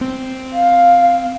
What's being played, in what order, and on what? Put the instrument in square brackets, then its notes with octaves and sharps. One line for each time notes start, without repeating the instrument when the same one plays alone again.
[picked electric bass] C4
[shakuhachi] F5